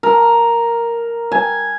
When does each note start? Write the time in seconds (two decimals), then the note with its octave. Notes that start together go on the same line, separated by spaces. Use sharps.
0.03 A#4
1.32 G#5